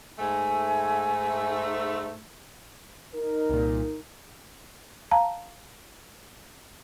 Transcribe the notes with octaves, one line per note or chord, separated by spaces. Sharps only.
G#2 A3 G#5
D#4 A#4
C2 A#2
F5 A5 A#5